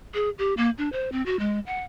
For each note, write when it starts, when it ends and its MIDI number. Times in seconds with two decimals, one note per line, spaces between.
0.14 0.30 68
0.39 0.54 67
0.57 0.70 58
0.78 0.91 62
0.92 1.12 72
1.12 1.24 60
1.26 1.38 66
1.40 1.60 56
1.67 1.83 78